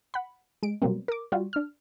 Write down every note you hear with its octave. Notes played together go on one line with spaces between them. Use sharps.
F#5 B5
G#3 D7
B2 F#3 G3 A#3 C4
A#4 D6
G3 F4 F#4
D4 F6